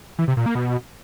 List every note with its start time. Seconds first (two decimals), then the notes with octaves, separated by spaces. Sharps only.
0.19 E3
0.28 C3
0.37 A#2
0.46 A#3
0.55 B2